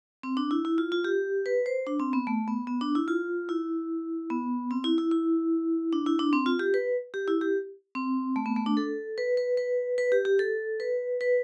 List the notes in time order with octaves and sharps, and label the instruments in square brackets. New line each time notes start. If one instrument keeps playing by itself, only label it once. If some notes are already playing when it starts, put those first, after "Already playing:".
[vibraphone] C4
D4
E4
E4
F4
F4
G4
B4
C5
D4
C4
B3
A3
B3
B3
D4
E4
F4
E4
B3
C4
E4
E4
E4
D4
E4
D4
C4
F4
G4
B4
G4
E4
G4
C4
A3
B3
A3
D4
A4
B4
B4
B4
B4
G4
G4
A4
B4
B4